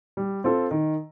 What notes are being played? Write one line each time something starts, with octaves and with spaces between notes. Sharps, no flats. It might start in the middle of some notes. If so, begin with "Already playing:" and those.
G3
C4 F4 A4
D#3